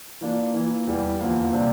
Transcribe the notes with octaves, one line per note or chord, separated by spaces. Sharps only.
E3 A#3 D4 F4
E3 A#3 F4
E2 E3 G3
E2 D3 F3 A#3 F4
C3 G3 A#3 D4 G4